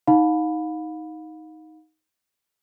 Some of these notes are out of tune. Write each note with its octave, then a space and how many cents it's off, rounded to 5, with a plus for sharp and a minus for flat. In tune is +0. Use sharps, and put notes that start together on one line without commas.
D#4 +15 F5 +40 B5 +0